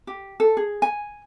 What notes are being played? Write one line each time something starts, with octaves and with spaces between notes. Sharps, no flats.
G4
A4
G#4
G#5